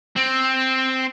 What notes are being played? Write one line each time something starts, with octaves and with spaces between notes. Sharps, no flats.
C4